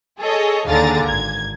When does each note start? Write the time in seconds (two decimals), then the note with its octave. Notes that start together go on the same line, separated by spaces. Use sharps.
0.20 G#4 A4 C#5 D#5
0.66 D#2 D3 G#4 F5 A#5 A6
1.07 G#1 G#6